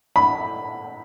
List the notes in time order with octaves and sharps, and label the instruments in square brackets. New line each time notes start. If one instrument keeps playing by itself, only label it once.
[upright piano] B5